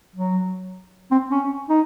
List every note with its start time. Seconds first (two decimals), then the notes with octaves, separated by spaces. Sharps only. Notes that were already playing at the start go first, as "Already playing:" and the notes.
0.15 F#3
1.11 C4
1.31 C#4
1.69 D#4